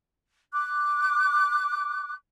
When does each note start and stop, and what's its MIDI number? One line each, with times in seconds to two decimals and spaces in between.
0.53 2.13 86
0.53 2.13 90